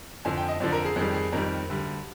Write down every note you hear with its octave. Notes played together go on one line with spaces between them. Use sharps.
F2 D3 F3 G#5
G5
D#5
F2 D3 F3 D5
A#4
G#4
F2 D#3 G3 G#4
G#4
F2 D#3 G3 A#4
D2 D3 G3